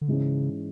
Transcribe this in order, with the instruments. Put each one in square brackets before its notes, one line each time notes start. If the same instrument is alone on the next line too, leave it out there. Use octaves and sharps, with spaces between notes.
[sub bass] D3
[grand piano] G#2 E3 G#3 C#4 [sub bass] C#3